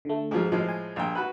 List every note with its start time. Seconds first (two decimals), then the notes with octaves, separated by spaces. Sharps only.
0.05 D3 A3
0.31 G#2 F3 G#4
0.51 A2 F3 G#3
0.68 G#5
0.96 A#1 G5
1.15 F#4 B4